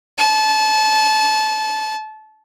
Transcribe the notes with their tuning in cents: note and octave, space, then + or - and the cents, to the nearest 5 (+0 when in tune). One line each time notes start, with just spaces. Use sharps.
A5 -25